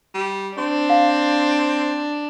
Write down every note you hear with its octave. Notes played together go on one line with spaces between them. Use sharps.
G3
C4 D4 C#6
F5